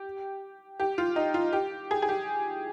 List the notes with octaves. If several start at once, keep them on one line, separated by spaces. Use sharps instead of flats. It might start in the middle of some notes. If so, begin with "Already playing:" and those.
Already playing: G4
G4
F4
D#4
F4
G4
G#4
G#4
G4